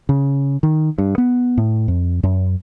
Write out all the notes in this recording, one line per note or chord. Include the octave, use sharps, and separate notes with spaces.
C#3
D#3
G2
B3
A2
F2
F#2